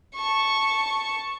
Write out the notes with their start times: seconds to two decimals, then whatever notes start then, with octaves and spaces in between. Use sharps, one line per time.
0.16 A5 C#6